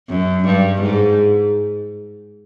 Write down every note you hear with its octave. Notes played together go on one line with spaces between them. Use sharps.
F#2
G2
G#2